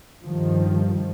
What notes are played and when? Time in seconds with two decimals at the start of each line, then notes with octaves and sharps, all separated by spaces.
0.22 G2 D#3 F3